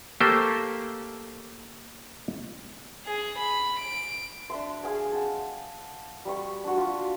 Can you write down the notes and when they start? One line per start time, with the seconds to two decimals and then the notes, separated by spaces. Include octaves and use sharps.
0.20 A3 A#3 G4 A4 C5
3.06 G#4
3.39 B5
3.80 D7
4.50 D4 E5 C6
4.83 G#4 F5 G#5
5.12 D#5 F#5 G5 A5
6.25 G3 B5 C#6
6.64 D4 F#4
6.78 F4 G4